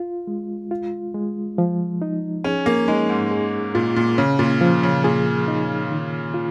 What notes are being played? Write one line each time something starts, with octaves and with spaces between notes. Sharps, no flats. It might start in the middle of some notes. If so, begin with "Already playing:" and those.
Already playing: F4
G#3
F4
G#3
F3
D#4
C#4 G#4
A#3
G#3 D#4
G#2
G#4
A#2 F4
A#2
C#3 C#4
A#2
F3
C#3
A#2 G#4
D#4
D#3
F4